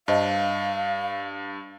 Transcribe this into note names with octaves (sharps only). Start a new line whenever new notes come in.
G2 C5 D#5 F5 A5